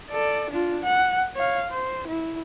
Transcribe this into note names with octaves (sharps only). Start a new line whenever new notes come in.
A4 D5
D4 F4
F#5
C#5 F5
C5
E4